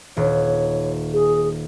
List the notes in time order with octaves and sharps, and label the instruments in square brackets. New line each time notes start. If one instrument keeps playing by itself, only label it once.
[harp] D#1 [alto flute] C#5
[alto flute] G#4